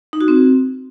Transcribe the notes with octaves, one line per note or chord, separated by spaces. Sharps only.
D#4
F#4
C4